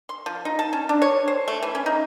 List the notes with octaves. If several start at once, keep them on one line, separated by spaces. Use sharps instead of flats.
C6
F3
D#4
A5
C#4
D4
C#5
C5
A3
E3
C#4
D#4